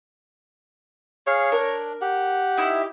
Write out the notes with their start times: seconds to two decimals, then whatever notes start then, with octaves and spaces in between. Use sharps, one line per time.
1.27 G#4 C#5 F5 F6
1.52 D4 A#4
2.01 G4 F#5
2.57 D#4 E4 E5